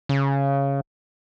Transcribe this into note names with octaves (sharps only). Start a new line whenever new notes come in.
C#3